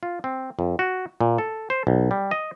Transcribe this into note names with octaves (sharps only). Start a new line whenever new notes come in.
F4
C4
F2
F#4
A#2
A4
C5
B1
G3
D#5